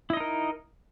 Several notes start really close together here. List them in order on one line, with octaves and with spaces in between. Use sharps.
E4 D#5 D#4 A#4